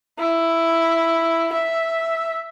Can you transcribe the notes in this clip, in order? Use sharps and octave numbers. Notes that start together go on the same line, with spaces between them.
E4
E5